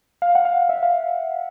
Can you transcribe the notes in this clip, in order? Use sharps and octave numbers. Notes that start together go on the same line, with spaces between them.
F5
F#5
F5
E5
F5